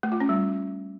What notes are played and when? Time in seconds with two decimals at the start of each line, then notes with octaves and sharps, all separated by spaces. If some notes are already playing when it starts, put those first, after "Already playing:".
0.03 A3
0.12 F4
0.20 C#4
0.29 G3